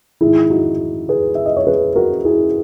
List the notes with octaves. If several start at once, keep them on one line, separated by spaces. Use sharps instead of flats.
G#2 D#3 E4 G#4
D#4 F#4
G#4 B4
E5
D#5
C#5
G#4 B4
F#4 A#4
E4 G#4